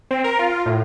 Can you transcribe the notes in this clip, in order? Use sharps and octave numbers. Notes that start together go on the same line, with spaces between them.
C4
A#4
F4
A2